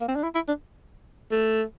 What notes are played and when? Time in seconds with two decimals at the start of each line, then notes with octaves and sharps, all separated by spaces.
0.01 A#3
0.08 C4
0.16 D4
0.23 E4
0.35 E4
0.48 D4
1.31 A3